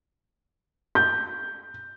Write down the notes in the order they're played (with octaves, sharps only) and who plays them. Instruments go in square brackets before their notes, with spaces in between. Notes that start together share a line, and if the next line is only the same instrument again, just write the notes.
[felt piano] G6